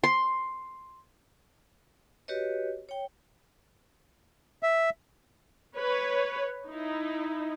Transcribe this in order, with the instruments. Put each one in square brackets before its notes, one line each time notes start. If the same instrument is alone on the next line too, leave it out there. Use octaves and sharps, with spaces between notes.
[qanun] C6
[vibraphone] F#4 G4 B4 C#5 D#5
C#5 G5
[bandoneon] E5
[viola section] B4 C#5
D#4 E4